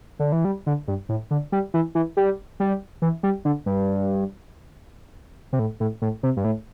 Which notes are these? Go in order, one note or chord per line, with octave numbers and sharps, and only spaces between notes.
D3
E3
G3
D3
G2
A2
D3
G3
E3
E3
G3
G3
E3
G3
D3
G2
C3
A2
A2
A2
C3
G2
A2